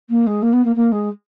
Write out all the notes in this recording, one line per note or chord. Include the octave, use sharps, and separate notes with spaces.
A#3
G#3
A#3
B3
A#3
A#3
G#3